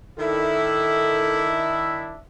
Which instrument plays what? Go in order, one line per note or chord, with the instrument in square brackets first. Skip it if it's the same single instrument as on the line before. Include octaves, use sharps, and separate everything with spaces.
[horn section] D#3 E4 [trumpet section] D4 E5 [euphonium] A4